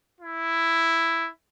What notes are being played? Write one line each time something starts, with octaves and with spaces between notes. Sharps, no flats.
E4